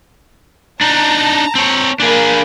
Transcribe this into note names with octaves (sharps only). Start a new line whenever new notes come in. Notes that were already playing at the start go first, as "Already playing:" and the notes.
D4 D#4 A5 A#5
C4 C#5
A#3 D4 G#4 B5